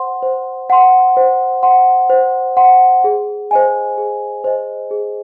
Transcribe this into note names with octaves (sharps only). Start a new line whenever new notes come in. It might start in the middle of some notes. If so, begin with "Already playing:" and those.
Already playing: C5 F#5 C6
C5
F#5 C6
C5
F#5 C6
C5
F#5 C6
G#4
C5 D#5 G#5
G#4
C5 D#5 G#5
G#4